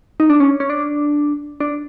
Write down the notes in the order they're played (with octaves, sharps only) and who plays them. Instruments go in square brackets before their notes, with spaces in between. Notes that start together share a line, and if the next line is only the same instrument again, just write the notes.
[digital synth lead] D#4
D4
C#4
C#4
D4
D4